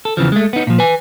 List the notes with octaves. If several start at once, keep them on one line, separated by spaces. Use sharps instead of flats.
A4
E2 C#3 E3 F3
G#3 A3
B3 D#4
A#2 F3
B4 G#5